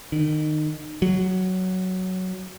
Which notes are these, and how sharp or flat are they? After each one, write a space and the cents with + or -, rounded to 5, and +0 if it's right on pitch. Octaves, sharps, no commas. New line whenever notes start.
D#3 -25
F#3 +5